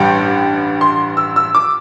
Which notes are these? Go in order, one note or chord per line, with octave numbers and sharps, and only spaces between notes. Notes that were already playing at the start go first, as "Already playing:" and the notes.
Already playing: A1 G2 G3 G5
C6
E6
E6
D6